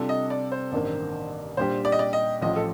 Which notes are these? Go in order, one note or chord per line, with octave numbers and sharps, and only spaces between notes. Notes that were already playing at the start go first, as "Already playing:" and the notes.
Already playing: C3 G3 D4 F4 A4
D#5
D5
C5
A1 G2 D#3 A#3
A#2 G3 D4 G4 C5
D5
D#5
D5
D#5
A1 A2 F3 D#5
A4